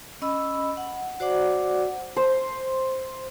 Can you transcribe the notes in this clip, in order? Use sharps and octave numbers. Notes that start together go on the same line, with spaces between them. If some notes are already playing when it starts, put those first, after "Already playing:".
C#4 D#5 B5 E6
F#5
F#4 C5 D5 F#5 D6
C5